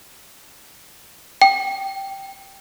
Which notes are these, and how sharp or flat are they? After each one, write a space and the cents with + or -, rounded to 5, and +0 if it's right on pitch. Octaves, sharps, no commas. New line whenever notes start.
G5 -5